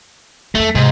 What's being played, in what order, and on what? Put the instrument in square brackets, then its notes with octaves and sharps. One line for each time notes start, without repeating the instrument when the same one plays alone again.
[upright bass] F2 D#4 [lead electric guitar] A3
[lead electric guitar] G#2 [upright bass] C3